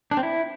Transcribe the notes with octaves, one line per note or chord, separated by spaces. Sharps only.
D4
C4
E4